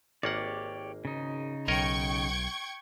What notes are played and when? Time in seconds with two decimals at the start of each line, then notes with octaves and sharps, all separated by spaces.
0.23 G#1 A#3 G4 C#5 D5 F#5
1.05 C#3 D#4
1.68 B1 A#4 C#5 D#5 G5 C#6 G#6